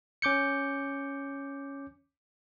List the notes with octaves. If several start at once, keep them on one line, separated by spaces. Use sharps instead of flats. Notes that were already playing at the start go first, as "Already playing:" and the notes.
C#4 D6 G6 C#7